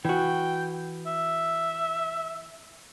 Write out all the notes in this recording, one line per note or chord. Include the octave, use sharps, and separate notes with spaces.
E3 F#4 G5
E5